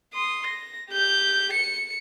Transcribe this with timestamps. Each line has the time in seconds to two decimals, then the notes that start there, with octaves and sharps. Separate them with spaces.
0.13 C6 D#6
0.47 A#6
0.90 G4 G6
1.53 C#7